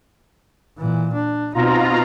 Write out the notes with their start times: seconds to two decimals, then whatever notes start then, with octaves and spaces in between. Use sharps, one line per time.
0.78 A#2 E3
1.13 D4
1.54 B2 C4 D#4 F4 A#5